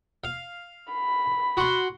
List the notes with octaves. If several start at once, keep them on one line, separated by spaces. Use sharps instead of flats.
F5
B5
F#4 C6